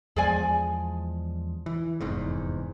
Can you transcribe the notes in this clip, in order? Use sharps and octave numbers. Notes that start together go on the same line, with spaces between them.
E2 F3 G#3 G#4 D5 G#5
E3
F1 E2 G#2